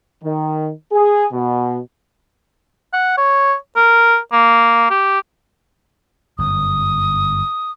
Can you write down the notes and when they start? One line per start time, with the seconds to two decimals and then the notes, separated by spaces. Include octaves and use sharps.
0.24 D#3
0.92 G#4
1.32 B2
2.93 F#5
3.18 C#5
3.76 A#4
4.32 A#3
4.91 G4
6.38 G1 F#2 D#6